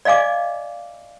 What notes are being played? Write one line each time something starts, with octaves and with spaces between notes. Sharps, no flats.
D5 D#5 F5 G#5 D6